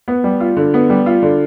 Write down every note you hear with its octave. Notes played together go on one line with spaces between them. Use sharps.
B3
G3
F4
D3
B3
G3
F4
D3